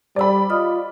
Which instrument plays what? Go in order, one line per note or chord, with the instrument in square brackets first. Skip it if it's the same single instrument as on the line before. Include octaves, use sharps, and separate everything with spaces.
[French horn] G3 [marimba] C5 E6 [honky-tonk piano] D5 B5
[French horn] F4 [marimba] D#5 D#6 F6